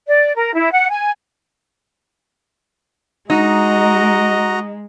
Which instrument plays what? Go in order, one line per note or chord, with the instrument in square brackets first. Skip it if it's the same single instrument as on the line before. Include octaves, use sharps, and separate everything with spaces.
[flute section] D5
A#4
E4
F#5
G#5
[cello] G#3 [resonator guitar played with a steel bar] D#4 [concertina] F#4 A#5 [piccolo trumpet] D#5